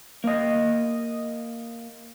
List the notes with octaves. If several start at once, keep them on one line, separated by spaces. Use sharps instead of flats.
A#3 D#5